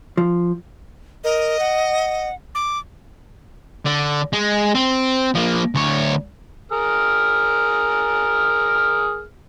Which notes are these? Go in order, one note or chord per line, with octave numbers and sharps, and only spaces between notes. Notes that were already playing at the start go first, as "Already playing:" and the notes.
F3
A#4 D#5
F#5
D6
D3
G#3
C4
F3 A#3
D2 C#5
G#4 A#4 F6